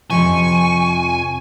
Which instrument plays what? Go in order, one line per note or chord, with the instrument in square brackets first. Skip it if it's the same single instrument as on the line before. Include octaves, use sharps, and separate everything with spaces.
[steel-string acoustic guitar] F2 C3 F3 [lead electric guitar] G#5 [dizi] C#6